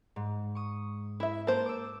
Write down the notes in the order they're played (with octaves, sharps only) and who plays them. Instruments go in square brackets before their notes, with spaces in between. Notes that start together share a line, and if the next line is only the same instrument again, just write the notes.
[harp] G#2
C#6 D#6
[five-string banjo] E4 E5
[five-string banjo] A#3 C5 [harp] A5
[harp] D6 E6